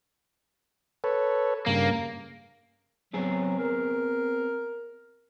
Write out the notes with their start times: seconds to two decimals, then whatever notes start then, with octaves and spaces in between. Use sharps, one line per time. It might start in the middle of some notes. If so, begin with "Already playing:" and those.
1.04 A4 B4 C#5
1.67 G2 C#3 A#3
3.13 F#3 B3 C4 G#4
3.58 A#4